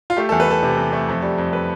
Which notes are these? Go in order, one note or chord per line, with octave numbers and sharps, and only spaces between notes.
F4
A3 G4
A4
E2
B4
E2 A4
C3
E2
A3
F2
G3
F2
B4